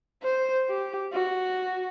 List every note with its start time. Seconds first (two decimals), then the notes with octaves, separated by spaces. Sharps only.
0.23 C5
0.69 G4
1.13 F#4